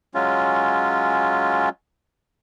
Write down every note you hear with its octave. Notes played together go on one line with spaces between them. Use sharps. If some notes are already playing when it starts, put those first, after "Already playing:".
F#3 G#3 C#4 F4